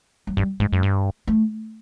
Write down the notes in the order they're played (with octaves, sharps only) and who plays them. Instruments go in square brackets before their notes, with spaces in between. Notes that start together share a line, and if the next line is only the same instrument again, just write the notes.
[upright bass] F#3
[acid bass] G2 [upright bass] G3
[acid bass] G#2 [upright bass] G#3
[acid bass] F#2
G2
[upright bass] A3